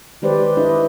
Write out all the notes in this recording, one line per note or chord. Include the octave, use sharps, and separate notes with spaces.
D#3 G#3 G4 B4 C5 D5
D4 E4 B4 D#5